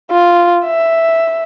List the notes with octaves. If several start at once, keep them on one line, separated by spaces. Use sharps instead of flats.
F4
E5